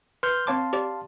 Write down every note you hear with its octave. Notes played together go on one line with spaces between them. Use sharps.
B4 C6 F6 G6
C4 C#5 F5 A5 C6 D6
G4 C5 D5